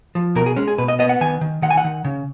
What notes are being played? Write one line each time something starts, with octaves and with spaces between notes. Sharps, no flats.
F3
B2 A#4
G#4
G#3 C#4
G#4
B2 B4
D#5
B3 D#5
F#5
D#3 G#5
D#3
D#3 F#5
G#5
F#5
D#3
C#3